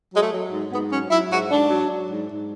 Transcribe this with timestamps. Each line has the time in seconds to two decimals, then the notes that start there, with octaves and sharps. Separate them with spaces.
0.12 F#3 G#3
0.22 A3
0.32 F#3
0.51 G#2
0.71 G#2 B3
0.91 F#3 C#4
1.11 F#3 E4
1.31 G#2 F#4
1.50 G#2 D4
1.70 F#3
1.90 F#3
2.09 G#2
2.29 G#2